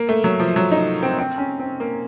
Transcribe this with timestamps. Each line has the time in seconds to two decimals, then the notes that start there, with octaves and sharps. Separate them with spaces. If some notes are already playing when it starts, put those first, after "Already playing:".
Already playing: A#3
0.09 A3
0.24 F#3
0.40 F3
0.56 F#3
0.71 D#4
1.03 C4
1.18 C4
1.38 C#4
1.59 C4
1.80 A#3